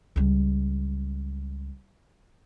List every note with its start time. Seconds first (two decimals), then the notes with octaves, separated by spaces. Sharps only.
0.16 C#2 G3